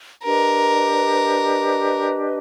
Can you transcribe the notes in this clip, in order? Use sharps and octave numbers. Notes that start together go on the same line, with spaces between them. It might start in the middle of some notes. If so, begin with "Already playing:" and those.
D4 G4 A#4 B4 D#5